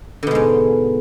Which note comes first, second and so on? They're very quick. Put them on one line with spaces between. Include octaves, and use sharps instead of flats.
D3 B2 G#3 G#2